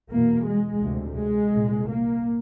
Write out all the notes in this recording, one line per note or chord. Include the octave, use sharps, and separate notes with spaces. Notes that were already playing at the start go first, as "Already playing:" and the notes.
E2 B2 A#3
G#3
D2 C3
G#3
C2 A#2
A#3